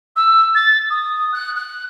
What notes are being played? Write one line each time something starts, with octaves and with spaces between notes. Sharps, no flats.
E6
A6
D#6
F#6
F#6